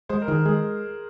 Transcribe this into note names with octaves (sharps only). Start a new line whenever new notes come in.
G#3 C5
A#4
D#3 G#4
A#4
G#3 G#4